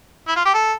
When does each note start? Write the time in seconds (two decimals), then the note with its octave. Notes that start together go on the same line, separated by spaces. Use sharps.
0.28 E4
0.36 F4
0.45 G4
0.54 A4